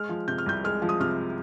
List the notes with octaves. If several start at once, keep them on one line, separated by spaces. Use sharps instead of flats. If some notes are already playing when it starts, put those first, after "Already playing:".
Already playing: G#3 F6
F3
C3 G6
F6
C2 G6
G#3 F6
F3
D#6
C3 F6